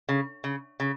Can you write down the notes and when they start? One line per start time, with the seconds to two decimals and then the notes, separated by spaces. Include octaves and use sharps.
0.09 C#3
0.44 C#3
0.80 C#3